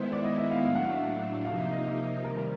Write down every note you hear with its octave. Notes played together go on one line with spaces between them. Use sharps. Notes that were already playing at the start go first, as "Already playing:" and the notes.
Already playing: D#3 G#3 B3 E4 C5
D5
D#5
E5
F5
A2 F#3 A3 D4 F5
F#5
F5
E5
C3 F3 A#3 D#4 F5
E5
D#5
E5
C3 D#3 G3 A#4
A#4